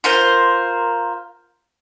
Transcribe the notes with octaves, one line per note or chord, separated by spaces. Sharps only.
F4 A#4 C5